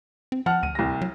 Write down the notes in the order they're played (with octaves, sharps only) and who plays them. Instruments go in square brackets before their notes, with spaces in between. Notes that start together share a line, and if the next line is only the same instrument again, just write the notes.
[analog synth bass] C4
[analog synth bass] F3 [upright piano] F#5 A5 F6
[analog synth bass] D2 [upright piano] D#7
[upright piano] C2 A#6
[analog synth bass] F#3